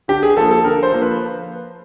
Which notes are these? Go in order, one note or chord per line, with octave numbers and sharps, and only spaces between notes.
D3 G4
G#4
F3 A#3 A4
A4
D3 A#4
C5
F3 A#3
B4